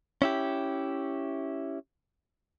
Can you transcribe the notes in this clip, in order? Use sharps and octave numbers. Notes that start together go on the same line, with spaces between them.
C#4 E4 G4